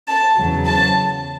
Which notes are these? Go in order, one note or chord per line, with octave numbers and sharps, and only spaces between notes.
A5
E2 C#3 F#3
A5